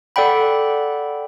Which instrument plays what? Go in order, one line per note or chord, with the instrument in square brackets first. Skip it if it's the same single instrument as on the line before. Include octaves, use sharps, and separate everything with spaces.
[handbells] A4 D5 F#5 G5 B5